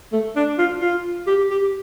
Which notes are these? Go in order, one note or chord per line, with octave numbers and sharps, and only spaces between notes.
A3
D4
F4
F4
G4
G4